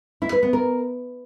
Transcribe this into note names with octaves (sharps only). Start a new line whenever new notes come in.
E4
B4
B3
A#4